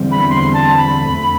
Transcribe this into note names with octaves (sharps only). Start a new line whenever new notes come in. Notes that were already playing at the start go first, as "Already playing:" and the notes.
Already playing: E2 D3 G3 C4
B5
C6
A5
B5
F2 D3 A3 C4